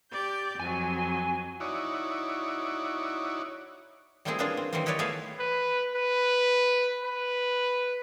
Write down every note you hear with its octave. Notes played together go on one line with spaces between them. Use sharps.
G4 D5 G6
F2 F#3 G#5
D#4 E4 F#4 C#5 D5
G3 A3 A#3 C4 E4 G#4
A#3 B3 C#4 D4 F4 G#4
C4
D#3 E3 F#3 G3 A#3 C4
D#4 E4 G4 B4 C#5 D5
A3 B3 G4 G#4 E5 F5
B4
B4
B4